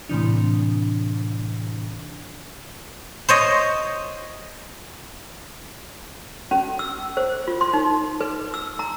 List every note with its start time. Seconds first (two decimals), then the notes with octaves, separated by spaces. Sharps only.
0.09 A2 C3 E3 D4
3.29 C5 C#5 D#5
6.51 C#4
6.79 E6
7.17 C5
7.48 F4
7.61 C6
7.73 D#4
8.21 B4
8.54 E6
8.79 A#5